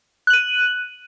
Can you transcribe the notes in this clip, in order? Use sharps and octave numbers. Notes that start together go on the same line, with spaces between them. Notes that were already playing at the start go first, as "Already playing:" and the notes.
F#6 D#7 F#7